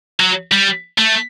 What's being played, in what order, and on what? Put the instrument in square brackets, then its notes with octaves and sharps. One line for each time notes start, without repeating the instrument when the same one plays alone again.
[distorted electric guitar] F#3
G3
A3